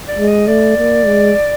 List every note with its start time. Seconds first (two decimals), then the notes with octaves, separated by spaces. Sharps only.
0.09 D5
0.18 G#3
0.28 D#5
0.47 A3 D5
0.77 A#3
1.06 G#3